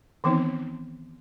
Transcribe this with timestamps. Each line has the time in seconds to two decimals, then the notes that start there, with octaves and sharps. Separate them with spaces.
0.24 D#3 E3 B3 C4 D#4